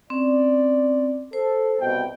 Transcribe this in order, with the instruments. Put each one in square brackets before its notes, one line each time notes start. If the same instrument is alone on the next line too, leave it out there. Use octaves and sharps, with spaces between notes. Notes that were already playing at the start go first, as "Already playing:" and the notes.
[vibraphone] C4 C#4 [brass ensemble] D5
[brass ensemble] A4 [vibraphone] C5
[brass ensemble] C2 B2 G5